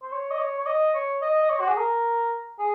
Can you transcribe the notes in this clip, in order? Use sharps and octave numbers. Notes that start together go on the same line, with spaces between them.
C5
C#5
D#5
C#5
C#5
D#5
C#5
D#5
D#5
C#5
F#4
G#4
A#4
G#4